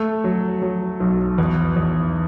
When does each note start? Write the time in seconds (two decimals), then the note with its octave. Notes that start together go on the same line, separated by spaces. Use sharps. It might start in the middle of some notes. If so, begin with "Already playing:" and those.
Already playing: A3
0.24 F#3
0.62 F#3
1.00 B1
1.38 E2
1.76 E2